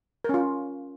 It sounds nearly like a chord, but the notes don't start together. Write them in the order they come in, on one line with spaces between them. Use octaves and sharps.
A#4 C#4 F4